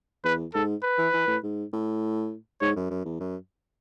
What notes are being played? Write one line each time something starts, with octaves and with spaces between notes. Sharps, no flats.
E2 B4
G#2 A4
B4
E3
E3
A2
G#2
A2
G#2 C#5
F#2
F#2
E2
F#2